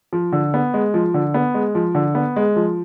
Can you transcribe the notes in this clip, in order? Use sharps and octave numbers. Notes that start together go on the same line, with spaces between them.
F3
D3
B3
G#3
F3
D3
B3
G#3
F3
D3
B3
G#3
F3